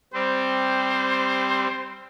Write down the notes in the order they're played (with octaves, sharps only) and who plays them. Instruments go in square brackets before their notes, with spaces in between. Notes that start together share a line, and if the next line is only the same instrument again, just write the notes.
[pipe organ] G3 C4 [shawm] C5